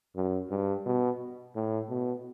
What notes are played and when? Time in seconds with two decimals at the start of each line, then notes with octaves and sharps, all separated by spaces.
0.16 F#2
0.50 G2
0.86 B2
1.56 A2
1.90 B2